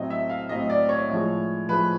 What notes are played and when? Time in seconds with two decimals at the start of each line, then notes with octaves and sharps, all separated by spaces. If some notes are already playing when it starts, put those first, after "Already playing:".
Already playing: A2 F#3 A3 C4 D#5
0.10 E5
0.30 F5
0.49 A2 F#3 A3 C4 D#5
0.70 D5
0.89 C#5
1.09 A2 F3 G#3
1.69 A2 F3 G#3 B4